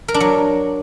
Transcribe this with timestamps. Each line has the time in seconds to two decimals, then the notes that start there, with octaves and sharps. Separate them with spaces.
0.08 A#4
0.14 D4
0.20 F#3